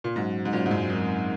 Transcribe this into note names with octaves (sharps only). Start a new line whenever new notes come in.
A#2
G#2 F#3 C#4 F#4 C5
G#2
A#2 F#3 C#4 F#4 C5
G#2
F#2
G#3 C4 D#4 A#4